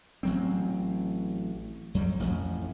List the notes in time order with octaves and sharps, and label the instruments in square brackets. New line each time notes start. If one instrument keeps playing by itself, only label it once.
[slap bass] A1 F#3 C4
F2 F#3 G3
A1 F2 A2